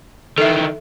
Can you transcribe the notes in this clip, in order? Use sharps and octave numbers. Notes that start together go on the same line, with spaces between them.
D#3 E3 A4 E5